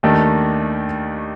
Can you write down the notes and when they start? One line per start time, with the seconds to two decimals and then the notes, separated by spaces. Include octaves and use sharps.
0.03 D#2 D#3 A3 D4